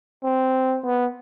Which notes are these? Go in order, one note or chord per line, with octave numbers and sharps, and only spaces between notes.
C4
B3